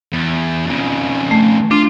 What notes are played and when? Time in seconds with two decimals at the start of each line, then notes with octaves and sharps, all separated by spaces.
0.13 E2
0.67 F2 C#3
1.31 A3
1.71 D4 F4